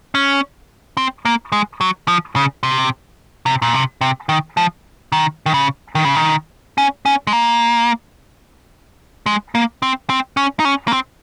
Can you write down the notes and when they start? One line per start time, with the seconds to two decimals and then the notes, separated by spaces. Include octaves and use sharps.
0.15 C#4
0.97 C4
1.25 A#3
1.52 G#3
1.81 F#3
2.08 F3
2.36 C#3
2.63 C3
3.46 C3
3.62 A#2
3.74 C3
4.01 C3
4.29 D#3
4.57 F3
5.12 D#3
5.46 D#3
5.54 C#3
5.95 D#3
6.05 C#3
6.15 D#3
6.78 C#4
7.05 C#4
7.27 G#3
7.33 A#3
9.26 G#3
9.55 A#3
9.82 C4
10.10 C4
10.37 C#4
10.60 D#4
10.65 C#4
10.88 A#3
10.92 C4